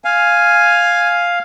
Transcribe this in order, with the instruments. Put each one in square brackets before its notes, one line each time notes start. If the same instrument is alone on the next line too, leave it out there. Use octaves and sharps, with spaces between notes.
[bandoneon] F5 [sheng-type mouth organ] G#5